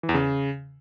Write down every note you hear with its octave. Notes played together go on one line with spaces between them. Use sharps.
E3
E2
C#3